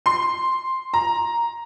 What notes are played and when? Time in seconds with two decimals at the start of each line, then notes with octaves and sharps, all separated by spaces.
0.06 C6
0.94 A#5